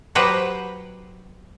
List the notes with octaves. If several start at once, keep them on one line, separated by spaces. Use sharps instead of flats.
F#3 G4 B4 C5 D#5 F#5